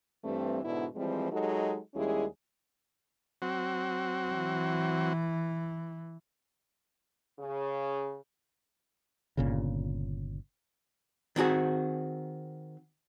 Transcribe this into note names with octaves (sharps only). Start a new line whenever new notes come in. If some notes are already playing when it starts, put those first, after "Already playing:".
G2 E3 G3 A3 C4
G#2 B2 D3 B3 D4 E4
E3 F3 G3 G#3 C4
F#3 G#3 D#4 F#4 G4 A4
D#2 G3 G#3 C#4 E4 G#4
F#3 C4 F#4
E3
C#3
G1 A#2 C#3
D#3 C4 F#4 G#4